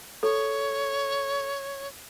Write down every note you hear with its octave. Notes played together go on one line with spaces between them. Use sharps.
A4 C#5